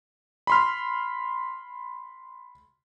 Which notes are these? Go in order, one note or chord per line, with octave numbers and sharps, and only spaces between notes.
B5 C6 F6